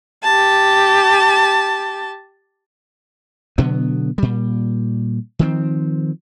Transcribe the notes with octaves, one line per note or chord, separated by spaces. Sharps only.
G4 A5
B2 D3 F#3 B3
A#2 G3
D#3 F3 C4